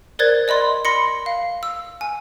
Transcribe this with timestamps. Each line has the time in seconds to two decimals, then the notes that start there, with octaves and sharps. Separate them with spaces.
0.19 A#4 C5 D5 F#6 G#6 A6
0.48 D5 D#5 B5 C6
0.85 B5 C6 A#6 C#7
1.26 F5
1.63 E6
2.01 G#5